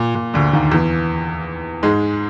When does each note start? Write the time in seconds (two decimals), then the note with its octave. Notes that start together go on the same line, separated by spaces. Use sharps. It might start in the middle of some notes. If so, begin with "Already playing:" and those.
Already playing: A#2
0.15 A#2
0.34 D2 D3
0.53 D#2 D#3
0.71 E2 E3
1.83 G#2 G#3